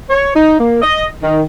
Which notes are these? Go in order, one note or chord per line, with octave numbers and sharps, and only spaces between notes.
C#5
D#4
A#3
D#5
D#3